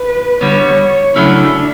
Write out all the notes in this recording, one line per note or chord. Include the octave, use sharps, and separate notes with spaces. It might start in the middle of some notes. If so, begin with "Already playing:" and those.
Already playing: B4
D3 G3 B3 C#5
C#3 F#3 A3 C#4 D4 E4